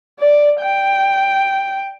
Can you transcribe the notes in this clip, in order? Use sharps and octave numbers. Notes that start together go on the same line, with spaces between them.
D5
G5